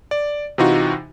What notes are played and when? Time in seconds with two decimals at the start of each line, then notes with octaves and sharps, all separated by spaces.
0.11 D5
0.58 C3 E3 D#4 F4 F#4